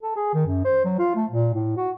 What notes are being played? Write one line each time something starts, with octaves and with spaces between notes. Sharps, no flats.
A4
G#4
D#3
F#2
C5
F#3
F4
A3
A#2
A2
F#4